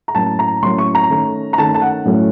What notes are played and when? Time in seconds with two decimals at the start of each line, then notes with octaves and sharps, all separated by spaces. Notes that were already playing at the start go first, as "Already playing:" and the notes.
0.08 A#5
0.15 A2 F#3 A#3 C#4 A5
0.39 A#5
0.62 A2 F#3 A#3 C#4 C6
0.78 C#6
0.95 A#5
1.10 D#3 A3 C#4
1.53 A#5
1.58 D#3 A3 C#4 A5
1.74 A5
1.82 F#5
2.05 A2 F#3 A3 C#4